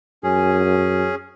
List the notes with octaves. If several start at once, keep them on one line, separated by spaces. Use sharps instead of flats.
F#2 C#4 G#4